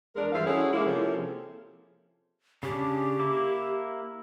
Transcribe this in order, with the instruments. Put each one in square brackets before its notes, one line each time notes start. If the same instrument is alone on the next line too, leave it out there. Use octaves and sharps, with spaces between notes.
[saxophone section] E2 G#3 D4 A#4
G2 E3 C5 E5 F5
C#4 E4 F#4 G#4 A4 C#5
G#3 A#3 E4
C3 F3 A#3 C#4 G#4 A4
[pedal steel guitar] C#3 C#4 D4 [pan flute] G4
[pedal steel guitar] A#3 E4 D6